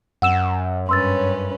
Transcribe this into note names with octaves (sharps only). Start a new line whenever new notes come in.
F#2 F#5 E6 E7
G2 C#4 B4 C6 E6 A6